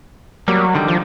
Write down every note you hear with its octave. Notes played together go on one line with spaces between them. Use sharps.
F#3 G3 A#3
D3 D#3 G3
F3